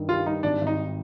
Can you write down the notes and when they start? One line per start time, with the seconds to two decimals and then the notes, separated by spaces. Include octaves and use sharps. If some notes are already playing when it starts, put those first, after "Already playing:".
Already playing: G2 D#3
0.08 G3 F4
0.26 G3 D#4
0.43 G#1 D4
0.61 G#1
0.67 D#4